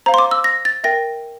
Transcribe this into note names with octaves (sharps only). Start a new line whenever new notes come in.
C5 F5 A#5
C6
D6
E6
A#6
A6
A#4 E5 G5 A#6